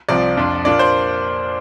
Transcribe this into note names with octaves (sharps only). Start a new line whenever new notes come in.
C2 C3 F3 C4 F4 D5
F2 F3 D4 F4
A#2 A#3 D4 F4 D5
C5